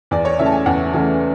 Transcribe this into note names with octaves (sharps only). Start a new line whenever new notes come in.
E2 D5
C#5
C#3 E3 A3 E5
A5
G#5
E2 F#5
C#3 E3 A3